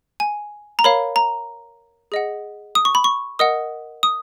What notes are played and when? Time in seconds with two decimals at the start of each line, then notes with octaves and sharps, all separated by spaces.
0.20 G#5
0.79 A#5
0.84 A#4 C#5 F5 B5
1.16 A#5
2.12 G#4 D#5 F#5
2.75 D#6
2.85 C#6
2.95 B5
3.04 C#6
3.39 A#4 D#5 F#5 D#6
4.03 D#6